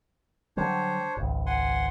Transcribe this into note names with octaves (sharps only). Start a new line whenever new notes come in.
D3 F#3 G3 D4 C5 C#5
G#1 C#2
F#5 G#5 C6